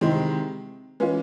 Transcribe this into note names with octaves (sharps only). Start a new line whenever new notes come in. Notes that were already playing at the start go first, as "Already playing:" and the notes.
C3 D#3 G#3 C4 E4
E3 G#3 C#4 F4